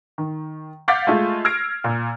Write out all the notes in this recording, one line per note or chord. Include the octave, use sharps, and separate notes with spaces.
D#3
F5 F#5 D6 G6 A6 B6
G#3 A3 F4
E6 F6 G#6 A#6 C7 D7
A#2